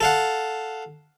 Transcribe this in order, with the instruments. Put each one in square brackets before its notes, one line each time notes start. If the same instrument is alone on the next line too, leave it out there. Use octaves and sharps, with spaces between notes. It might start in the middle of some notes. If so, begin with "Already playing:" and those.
[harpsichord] A4 F5 F#5